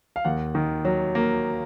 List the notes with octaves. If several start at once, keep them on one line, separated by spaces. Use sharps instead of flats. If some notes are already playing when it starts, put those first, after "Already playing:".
F5
D#2 F#5
D#3
F#3
A#3